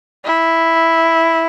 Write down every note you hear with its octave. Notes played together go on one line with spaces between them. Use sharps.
E4